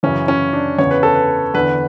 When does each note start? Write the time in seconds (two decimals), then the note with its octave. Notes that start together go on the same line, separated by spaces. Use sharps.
0.03 F#2 C#3 E3 C#4
0.28 C#4
0.53 D4
0.78 E2 C#3 E3 C#5
0.91 B4
1.03 A4
1.14 B4
1.54 E2 D3 B4